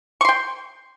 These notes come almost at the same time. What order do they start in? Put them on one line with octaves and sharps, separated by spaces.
C#6 C6 G5